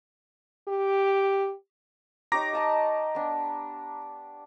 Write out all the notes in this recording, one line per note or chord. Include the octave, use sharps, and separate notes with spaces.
G4
D#4 G4 C#5 A#5 D6 A#6
D#5 A5 D#6
B3 D4